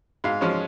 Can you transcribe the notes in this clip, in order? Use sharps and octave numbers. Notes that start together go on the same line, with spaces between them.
G#2 F5
F3 G#3 C#4